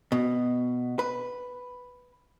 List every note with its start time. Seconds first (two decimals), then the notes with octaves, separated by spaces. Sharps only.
0.12 B2
0.99 B4